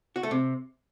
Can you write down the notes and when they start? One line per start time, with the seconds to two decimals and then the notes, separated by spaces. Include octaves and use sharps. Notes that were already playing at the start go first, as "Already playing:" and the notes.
0.16 F#4
0.23 A3
0.31 C3